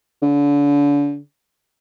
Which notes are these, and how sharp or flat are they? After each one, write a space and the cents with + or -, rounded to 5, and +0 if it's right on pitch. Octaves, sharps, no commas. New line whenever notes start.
D3 -35